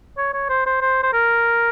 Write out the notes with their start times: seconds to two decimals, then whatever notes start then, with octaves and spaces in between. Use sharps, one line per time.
0.18 C#5
0.33 C#5
0.49 C5
0.66 C5
0.81 C5
1.03 C5
1.13 A#4